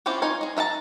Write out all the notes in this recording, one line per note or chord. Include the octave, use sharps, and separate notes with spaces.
C4 C#4 E4 F4 G4
D#4 F4 C#5 G#5
G#4 D#5
D#4 E5 F#5 A5 A#5